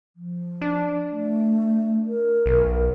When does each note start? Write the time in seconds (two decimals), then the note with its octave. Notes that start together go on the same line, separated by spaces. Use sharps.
0.16 F3
0.61 D4
1.11 A3
2.07 A#4
2.46 B1